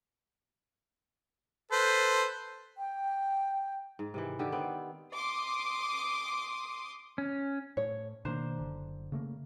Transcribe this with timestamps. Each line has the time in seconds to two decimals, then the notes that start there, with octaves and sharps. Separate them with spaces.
1.71 A4 B4 C5
2.78 G5
3.99 G#2
4.14 C3 D#3 E3
4.39 D3 D#3 G4 E5
4.52 B3 C4
5.13 C6 D6 D#6
7.18 C#4
7.77 A2 C#5
8.25 B2 D#3 A#3 D4 C5 A#5
8.58 F#1 D3
9.12 C#3 A3 A#3